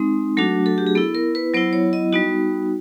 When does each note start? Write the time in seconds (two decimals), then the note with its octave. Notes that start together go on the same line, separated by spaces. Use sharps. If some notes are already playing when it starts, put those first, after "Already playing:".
Already playing: G#3 C4 D#4
0.37 F#3 A3 D4 F#4 A4
0.66 A4
0.78 G4
0.87 G#4
0.95 B3 E4 A4
1.15 A#4
1.35 B4
1.54 F#3 B3 E4 C5
1.73 C#5
1.93 D#5
2.13 G3 B3 D#4 F#4